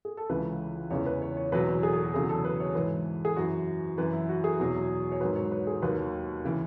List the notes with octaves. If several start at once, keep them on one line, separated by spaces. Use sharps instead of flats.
G#4
A4
C#2 C#3 E3 B4
E2 C#3 E3 C#5
B4
C#5
C#5
E2 B2 F#3 B4
B4
G#4
G#4
F#4
E2 C#3 F#3 G#4
A4
B4
C#5
G#2 E3 B4
G#4
F#2 E3 F#4
F#2 E3 B4
E4
F#4
G#4
E2 B2 F#3
C#5
G#2 D#3 F#3 B4
C#5
B4
G#4
D#2 D#3 F#3 B4
C#3 E3